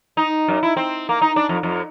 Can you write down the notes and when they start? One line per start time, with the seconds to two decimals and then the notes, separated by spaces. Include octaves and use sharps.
0.17 D#4
0.48 F#2
0.63 E4
0.77 C4
1.09 A#3
1.22 D#4
1.36 D4
1.49 F2
1.63 F2